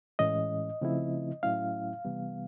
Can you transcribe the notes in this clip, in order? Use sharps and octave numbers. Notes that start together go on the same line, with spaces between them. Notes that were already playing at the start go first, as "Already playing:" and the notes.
A2 E3 G#3 C#4 D#5
C#3 F3 A3 C4 E4
A2 F#3 A3 C#4 E4 F5
C3 E3 G3 B3